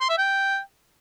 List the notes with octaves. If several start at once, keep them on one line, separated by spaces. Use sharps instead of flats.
C6
E5
G5